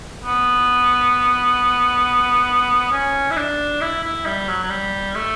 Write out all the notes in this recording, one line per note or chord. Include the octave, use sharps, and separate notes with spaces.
B3
C#4
E4
D4
E4
E4
G3
F#3
F#3
G3
A3